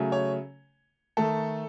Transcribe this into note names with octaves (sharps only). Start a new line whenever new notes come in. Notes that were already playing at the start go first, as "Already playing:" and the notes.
Already playing: C#3 F#3 A3
C#5
D#3 A3 A4